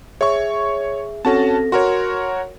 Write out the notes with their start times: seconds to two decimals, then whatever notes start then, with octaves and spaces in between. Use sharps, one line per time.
0.21 G#4 C#5 E5 C#6
1.25 C4 C#4 F#4 A4 A5 A#6
1.72 F#4 A#4 C#5 C6